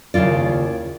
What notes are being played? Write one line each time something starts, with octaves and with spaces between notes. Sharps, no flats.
D#2 C#3 E4 F4 D5